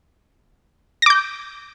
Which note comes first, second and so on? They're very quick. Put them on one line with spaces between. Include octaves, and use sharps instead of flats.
A#6 D6 G6